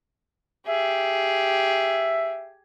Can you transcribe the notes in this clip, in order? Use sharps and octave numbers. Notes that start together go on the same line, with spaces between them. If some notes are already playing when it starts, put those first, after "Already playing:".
G4 G#4 E5